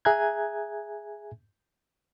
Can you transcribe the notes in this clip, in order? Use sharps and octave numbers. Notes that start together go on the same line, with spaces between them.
G#4 E5 G#5 A#5 F#6 G#6